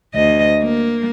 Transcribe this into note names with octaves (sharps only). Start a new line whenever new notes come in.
D2 D#5
A#3